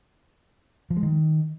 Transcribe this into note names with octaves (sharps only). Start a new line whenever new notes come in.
F3
G#3
D#3